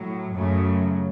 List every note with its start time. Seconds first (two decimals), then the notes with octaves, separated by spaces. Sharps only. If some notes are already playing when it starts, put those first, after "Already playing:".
Already playing: A2 F#3
0.35 F#2 C#3 F#3 A3